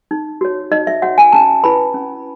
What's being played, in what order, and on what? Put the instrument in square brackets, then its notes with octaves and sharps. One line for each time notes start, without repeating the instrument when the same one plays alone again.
[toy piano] D#4
F#4 C#5
D#4 D#5
E5
F#4 C#5 F#5
G#5
C#4 A5
E4 B4 B5
C#4